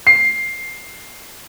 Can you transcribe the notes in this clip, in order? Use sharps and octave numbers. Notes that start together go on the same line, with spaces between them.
C7